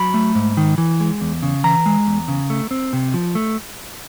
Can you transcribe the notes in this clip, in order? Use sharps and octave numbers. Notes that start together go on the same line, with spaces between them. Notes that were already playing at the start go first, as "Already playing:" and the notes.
Already playing: F#3 B5
A3
G#2
D#3
E3
G#3
E2
C#3
E3 A#5
G#3
E2
C#3
A3
C4
C3
F3
A3